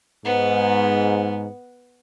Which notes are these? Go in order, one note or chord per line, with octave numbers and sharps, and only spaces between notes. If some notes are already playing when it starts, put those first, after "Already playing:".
G#2 B3